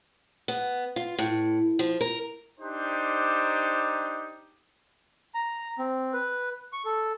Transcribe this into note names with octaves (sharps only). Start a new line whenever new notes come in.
B3
F4
A2
F3
A#4
D4 D#4 G4 C5
A#5
C4
B4
C#6
A4